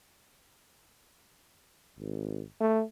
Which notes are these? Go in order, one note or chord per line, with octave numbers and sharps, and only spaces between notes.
G#1
A3